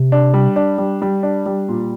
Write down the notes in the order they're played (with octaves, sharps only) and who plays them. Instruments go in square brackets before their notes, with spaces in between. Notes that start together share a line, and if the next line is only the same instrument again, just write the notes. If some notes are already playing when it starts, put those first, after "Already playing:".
Already playing: [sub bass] C3
[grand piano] D4
G3
D4
G3
G3
D4
G3
A#2